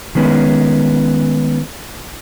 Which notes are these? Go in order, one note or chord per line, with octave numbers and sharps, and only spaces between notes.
D#3 G#3 B3 C#4